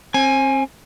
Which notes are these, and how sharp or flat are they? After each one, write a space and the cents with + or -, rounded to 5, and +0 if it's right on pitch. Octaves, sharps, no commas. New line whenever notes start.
C4 +30 G#5 +0